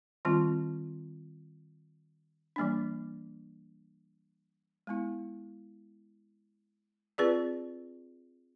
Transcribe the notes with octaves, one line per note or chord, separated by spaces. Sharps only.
D#3 G3 C4 F4
E3 G3 A#3 D4
G#3 B3 E4
C4 F4 G#4 B4 D5